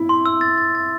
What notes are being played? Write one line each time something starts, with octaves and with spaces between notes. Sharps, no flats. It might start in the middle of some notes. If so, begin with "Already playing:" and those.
Already playing: E4
C6
E6
A6
A6
A6